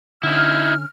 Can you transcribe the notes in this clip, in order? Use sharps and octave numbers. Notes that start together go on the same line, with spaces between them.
D3 C#4 D#4 E4 F6